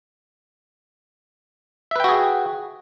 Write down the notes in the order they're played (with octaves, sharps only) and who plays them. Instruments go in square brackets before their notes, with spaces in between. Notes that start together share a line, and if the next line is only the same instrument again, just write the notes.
[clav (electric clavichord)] E5
B4
G5
F#4
G#4